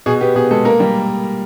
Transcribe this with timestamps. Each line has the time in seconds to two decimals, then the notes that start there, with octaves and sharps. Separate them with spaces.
0.06 B2 G#4
0.21 B3 G4
0.35 B2 G#4
0.51 G#3 A4
0.65 A#3 A#4
0.80 G3